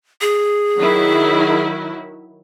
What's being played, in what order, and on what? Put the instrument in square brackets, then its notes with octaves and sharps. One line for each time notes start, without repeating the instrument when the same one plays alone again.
[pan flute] G#4
[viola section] D#3 F#3 E4